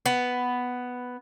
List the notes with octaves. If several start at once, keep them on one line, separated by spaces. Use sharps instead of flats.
B3